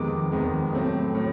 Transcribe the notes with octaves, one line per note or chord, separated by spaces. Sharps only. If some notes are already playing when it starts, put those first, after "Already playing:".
Already playing: F2 C3 D#3 G#3 B3 D6
F2 C3 D#3 G#3 B3
A2 F#3 A3 C4
A2 F#3